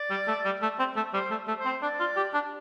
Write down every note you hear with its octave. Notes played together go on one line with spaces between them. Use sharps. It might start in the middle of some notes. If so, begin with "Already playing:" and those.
Already playing: D5
G3
A3
G3
A3
C4
A3
G3 C5
A3
A3
C5
C4
D4 D5
F4
G4
D4